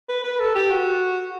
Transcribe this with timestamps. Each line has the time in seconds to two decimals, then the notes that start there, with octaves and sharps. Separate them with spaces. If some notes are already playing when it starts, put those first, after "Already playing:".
0.09 B4
0.24 B4
0.40 A4
0.55 G4
0.71 F#4